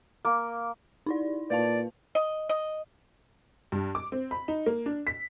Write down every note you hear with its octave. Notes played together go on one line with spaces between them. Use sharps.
A#3
D#4 E4 D5
A#2 B4 D5 F5 A5
D#5
D#5
G2
D6
C4
B5
D#4
A#3
D4
B6